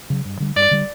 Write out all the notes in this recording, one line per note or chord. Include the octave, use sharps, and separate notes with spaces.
C#3 F#3
G2
D3 G3
G2 D5
D3 G3